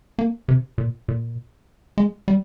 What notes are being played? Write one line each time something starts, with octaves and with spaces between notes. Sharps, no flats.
A#3
C3
A#2
A#2
G#3
G3